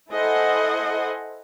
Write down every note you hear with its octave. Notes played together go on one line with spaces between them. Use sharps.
E4 A4 C5 D#5 F#5 G#5